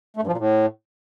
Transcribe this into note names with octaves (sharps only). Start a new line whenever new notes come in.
A3
G2
F3
A#2
A2